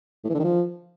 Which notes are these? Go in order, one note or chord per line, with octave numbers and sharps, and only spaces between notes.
A2
E3
D3
D#3
F3